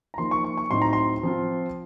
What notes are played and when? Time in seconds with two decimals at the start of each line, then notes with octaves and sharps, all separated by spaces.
0.14 A#5
0.18 F3 A#3 D#4 C6
0.31 C#6
0.44 C#6
0.57 C#6
0.70 A2 F#3 C4 D#4 C6
0.82 A#5
0.93 C6
1.23 F3 C4 F4